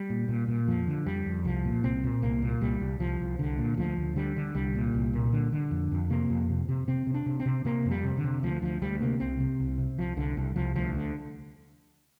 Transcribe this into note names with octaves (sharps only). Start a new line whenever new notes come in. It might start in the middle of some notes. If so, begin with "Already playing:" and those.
Already playing: G3
A#2
A#2
A#2
F2 F3
D3
F2 G3
F2
C2 F3
A#2
C2 C4
A#2
C2 A#3
A#2
C2 G3
C2
C2 F3
C2
C2 D3
A#2
D2 F3
D2
D3 G3
D3
C2 G3
A#2
C2
A#2
D3
D3
F2
F2
C3 A#3
F2
C3
C3
C3 C4
C3
D4
C3
C4
C3
C3 A#3
F2
G3
C3
D3
C3
D2 F3
D2 F3
D2 G3
C3 A#3
C2 C4
C3
C2
C3
C2 F3
C2 D3
C2
C2 F3
D2 F3
D3